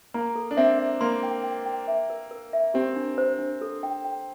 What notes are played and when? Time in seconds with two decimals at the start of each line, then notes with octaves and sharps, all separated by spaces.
0.14 A#3 A#5
0.35 A4
0.51 D4
0.57 C4 E5
0.79 E5
1.01 A#3 C6
1.23 G5
1.44 G5
1.66 G5
1.88 E5
2.10 A#4
2.31 A#4
2.53 E5
2.74 C4 G4
2.96 D4
3.18 C5
3.39 D4
3.61 A4
3.83 G5
4.04 G5